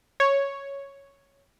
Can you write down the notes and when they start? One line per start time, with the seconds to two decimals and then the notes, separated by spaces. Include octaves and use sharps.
0.20 C#5